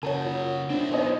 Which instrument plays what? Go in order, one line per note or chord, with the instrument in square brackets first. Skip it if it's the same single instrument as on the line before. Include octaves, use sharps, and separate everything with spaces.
[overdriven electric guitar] C#3 F#4 [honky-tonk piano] A#4 [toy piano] C#5 A5
[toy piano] F4 C#5
[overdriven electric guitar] C4 E4 [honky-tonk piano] D4
[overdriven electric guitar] B3 D#4 [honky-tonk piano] C5 C#5 D#5